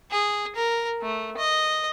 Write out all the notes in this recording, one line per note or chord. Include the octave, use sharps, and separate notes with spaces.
G#4
A#4
A3
D#5